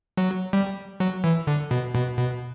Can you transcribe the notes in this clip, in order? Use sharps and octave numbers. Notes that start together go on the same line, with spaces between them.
F#3
G3
F#3
E3
D3
B2
B2
B2